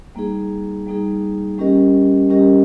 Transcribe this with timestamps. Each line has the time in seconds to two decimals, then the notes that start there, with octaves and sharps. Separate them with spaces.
0.15 G3 A#3 D#4 G#4
0.87 G3 A#3 D#4 G#4
1.58 G3 C#4 G4 A#4 D#5
2.30 G3 C#4 G4 A#4 D#5